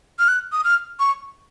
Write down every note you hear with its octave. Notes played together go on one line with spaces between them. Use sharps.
F6
F#6
D#6
F6
C#6